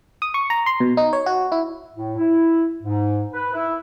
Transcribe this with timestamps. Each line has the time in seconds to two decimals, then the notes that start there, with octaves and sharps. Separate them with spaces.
0.22 D#6
0.34 C#6
0.50 A#5
0.66 C6
0.80 B2
0.97 D#4
1.13 C#5
1.26 F#4
1.52 E4
1.94 A2
2.17 E4
2.82 G#2
3.33 B4
3.53 E4